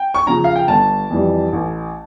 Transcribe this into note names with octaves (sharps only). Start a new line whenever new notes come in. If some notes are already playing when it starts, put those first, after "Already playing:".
Already playing: G5
C#6
C#3 F3 A#5
F5
G5
G1 A5
F2 E3 G3
A1